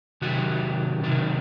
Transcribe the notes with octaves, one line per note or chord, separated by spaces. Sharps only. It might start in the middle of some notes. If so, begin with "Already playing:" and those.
C3 D#3 F#3 F#4
C3 D#3 F#3